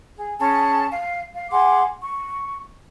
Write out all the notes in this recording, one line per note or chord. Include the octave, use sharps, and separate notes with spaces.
G#4
C#4 G#4 A5
F5
F5
G#4 F#5 C6 D6
C#6